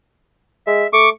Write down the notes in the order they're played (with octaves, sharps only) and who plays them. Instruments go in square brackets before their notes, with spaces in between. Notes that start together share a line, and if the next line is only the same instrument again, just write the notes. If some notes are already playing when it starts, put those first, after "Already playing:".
[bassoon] G#3 [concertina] E5
[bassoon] A3 [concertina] C#6 D6